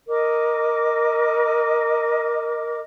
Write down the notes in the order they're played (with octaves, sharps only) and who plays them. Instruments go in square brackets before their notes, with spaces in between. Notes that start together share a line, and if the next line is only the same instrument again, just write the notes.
[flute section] A#4 D#5 D6